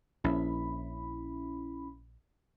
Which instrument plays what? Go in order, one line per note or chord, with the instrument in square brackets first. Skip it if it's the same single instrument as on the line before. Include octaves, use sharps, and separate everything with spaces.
[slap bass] A#1 [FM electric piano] C#4 E4 B5